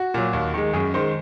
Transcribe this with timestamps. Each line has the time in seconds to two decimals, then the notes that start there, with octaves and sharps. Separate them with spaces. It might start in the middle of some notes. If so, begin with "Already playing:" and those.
Already playing: F#4
0.14 A#2 F#3
0.33 D#2
0.54 D#3 G#3
0.73 F#2 G#4
0.94 D#3 G#3 C5